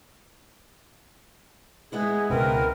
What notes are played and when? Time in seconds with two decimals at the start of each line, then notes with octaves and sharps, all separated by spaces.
1.92 G#3 B3 E4 G#4
2.30 C#2 B2 C4 A#4 B4